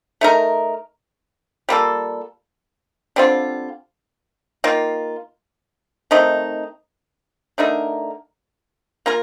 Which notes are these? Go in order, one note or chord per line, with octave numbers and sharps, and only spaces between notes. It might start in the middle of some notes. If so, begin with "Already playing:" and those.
A3 D#4 A#4
G3 A#3 F4 A4
D3 G3 C4 F4
D#3 A#3 F4
D#3 A3 C4 D#4
D3 A3 D#4 A#4
A#3 F4 A#4